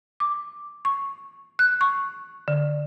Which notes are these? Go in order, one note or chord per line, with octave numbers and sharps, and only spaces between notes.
D6
C#6
F#6
C#6
D3